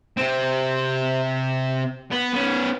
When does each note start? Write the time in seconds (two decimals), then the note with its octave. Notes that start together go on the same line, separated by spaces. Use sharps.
0.17 C3 C4
2.12 B3
2.34 B3 C#4